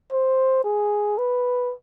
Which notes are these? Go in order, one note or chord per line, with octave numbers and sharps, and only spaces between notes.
C5
G#4
B4